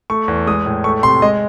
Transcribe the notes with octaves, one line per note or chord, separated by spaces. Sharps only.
A3 C#6
E2
G#3 D#6
A2
A3 C#6
C3 C6
G#3 D#5